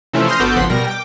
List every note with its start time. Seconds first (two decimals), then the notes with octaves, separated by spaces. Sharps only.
0.13 C3 E3 F3 A3 C#4 E4
0.28 C6 D#6 F6 G6 A#6 C7
0.40 G1 B3 F#4 A4 D6 G6
0.56 G#1 C#2 F3 F#5 C6 B6
0.70 B2 G3 A#4 A#6
0.87 G5 D6